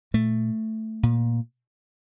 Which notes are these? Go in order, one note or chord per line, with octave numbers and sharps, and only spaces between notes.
A#2 A3
A#2